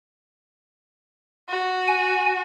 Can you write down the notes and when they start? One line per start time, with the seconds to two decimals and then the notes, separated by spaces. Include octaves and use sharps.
1.50 F#4
1.88 G#5